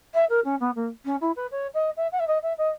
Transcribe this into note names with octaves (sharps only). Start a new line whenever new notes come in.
E5
A#4
C#4
B3
A#3
C#4
E4
B4
C#5
D#5
E5
F#5
E5
D#5
E5
D#5